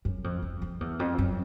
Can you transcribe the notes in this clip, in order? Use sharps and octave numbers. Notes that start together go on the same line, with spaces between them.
F#2
F2
F2
F2
E2
F2
F#2